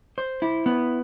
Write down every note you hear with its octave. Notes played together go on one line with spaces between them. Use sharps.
C5
E4
B3